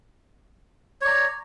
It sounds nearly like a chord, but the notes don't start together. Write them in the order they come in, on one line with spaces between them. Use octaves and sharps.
C#5 D5 A#5